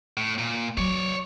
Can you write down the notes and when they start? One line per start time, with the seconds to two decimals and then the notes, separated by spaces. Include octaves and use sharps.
0.17 A2
0.39 A#2
0.77 F#3 C#5 D5